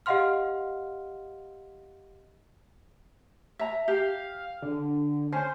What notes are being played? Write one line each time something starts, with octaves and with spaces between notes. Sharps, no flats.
G4 D#5 F5 F#5 C6 F6
E5 A#5
G4 F5
D3
C#4 C5 G#5